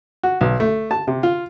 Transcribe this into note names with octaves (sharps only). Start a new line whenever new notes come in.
F#4
B1
A3
A5
C3
F4